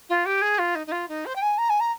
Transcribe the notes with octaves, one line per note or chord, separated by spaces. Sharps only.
F4
G4
G#4
F4
D#4
D#4
F4
D#4
C5
G5
G#5
A#5
G#5
A#5